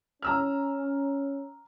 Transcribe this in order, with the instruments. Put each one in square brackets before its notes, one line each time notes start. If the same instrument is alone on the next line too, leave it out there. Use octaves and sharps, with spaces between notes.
[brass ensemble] C#4 [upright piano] A#5 E6 F6